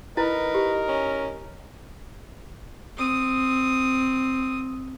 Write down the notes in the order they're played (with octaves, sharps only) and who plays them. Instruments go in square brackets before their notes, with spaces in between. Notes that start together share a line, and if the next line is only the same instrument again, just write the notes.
[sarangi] D#4 [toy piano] E4 [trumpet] A#4 [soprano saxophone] B4
[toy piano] G4
[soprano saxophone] C#4
[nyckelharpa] C4 D#6